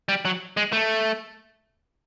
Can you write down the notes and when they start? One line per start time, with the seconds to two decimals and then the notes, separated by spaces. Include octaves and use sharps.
0.09 G3
0.25 F#3
0.57 G#3
0.72 A3